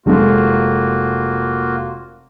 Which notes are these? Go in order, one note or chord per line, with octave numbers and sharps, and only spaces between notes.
F1 G#3 A#3 F4 F#4